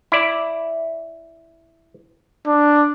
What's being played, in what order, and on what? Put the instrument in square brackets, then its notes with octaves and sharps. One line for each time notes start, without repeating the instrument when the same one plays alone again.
[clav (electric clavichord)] E4 D5
[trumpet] D4